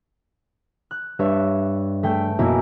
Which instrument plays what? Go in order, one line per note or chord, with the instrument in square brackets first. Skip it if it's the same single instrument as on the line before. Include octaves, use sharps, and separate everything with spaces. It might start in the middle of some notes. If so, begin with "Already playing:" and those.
[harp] F#6
[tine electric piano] G2 [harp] C#5 E5
[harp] A3 G5 G6
[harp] F#2 A#3 E4 [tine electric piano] B2